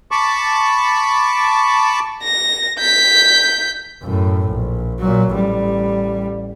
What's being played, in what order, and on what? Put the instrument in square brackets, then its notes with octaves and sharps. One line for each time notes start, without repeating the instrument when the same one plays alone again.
[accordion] A5 B5 C#6 D6
[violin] A#6
G6 B6
[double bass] F#2 A2
A#1
A#2 F#3
A1 G3